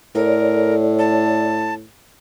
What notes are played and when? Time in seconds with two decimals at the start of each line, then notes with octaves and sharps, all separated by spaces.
0.15 A2 A4 A#4 C#5 D5
0.99 A5